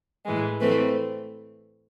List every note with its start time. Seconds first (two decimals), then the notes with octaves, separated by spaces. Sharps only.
0.26 A2 E3 G#3
0.61 E3 A3 C4 B4